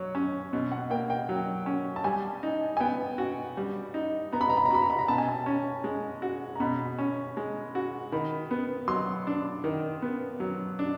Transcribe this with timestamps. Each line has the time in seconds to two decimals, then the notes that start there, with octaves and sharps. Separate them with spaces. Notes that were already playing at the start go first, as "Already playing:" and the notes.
Already playing: F#3 C#5
0.15 C#4
0.53 B2
0.72 F#5
0.90 A#3 G5
1.10 G5
1.29 F#3
1.66 C#4
1.96 A5
2.04 G3 G#5
2.43 D#4
2.77 G#5
2.80 B3 G5
3.18 F#4
3.57 G3
3.94 D#4
4.32 B3 A#5
4.41 B5
4.49 A#5
4.57 B5
4.65 A#5
4.71 F#4 B5
4.82 A#5
4.90 B5
4.99 A#5
5.08 B2 A5
5.18 G#5
5.28 A5
5.46 C#4
5.84 G#3
6.22 F#4
6.55 A#5
6.60 B2 B5
6.99 C#4
7.37 G#3
7.75 F#4
8.12 D#3 B5
8.51 B3
8.88 F#3 C6
9.27 D4
9.64 D#3
10.02 B3
10.40 F#3
10.79 D4